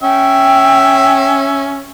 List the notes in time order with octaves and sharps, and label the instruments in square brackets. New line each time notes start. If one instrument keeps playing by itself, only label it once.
[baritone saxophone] C#4 [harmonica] E5 [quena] G5